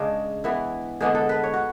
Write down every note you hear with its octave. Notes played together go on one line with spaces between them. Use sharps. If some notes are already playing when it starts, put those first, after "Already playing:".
Already playing: C#3 G#3 D4
E3 B3 E4
D3 G#3 B3 D4 G#4
A4
B4
C#5
F#4